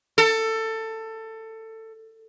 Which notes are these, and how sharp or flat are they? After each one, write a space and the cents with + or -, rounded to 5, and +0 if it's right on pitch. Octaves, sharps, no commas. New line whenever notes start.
A4 +20